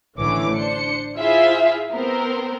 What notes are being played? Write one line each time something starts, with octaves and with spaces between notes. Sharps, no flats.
A1 A2 D3 E3 C#5 D6
D4 C5 C#7
E4 F4 G#4 C5 E5 F5
B3 C4 A#4 C5